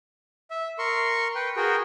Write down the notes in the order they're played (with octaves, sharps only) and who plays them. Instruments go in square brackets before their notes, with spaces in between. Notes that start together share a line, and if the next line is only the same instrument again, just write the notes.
[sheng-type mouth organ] E5
A#4 C6 C#6
B4 G5
F#4 G#4 A#4 G5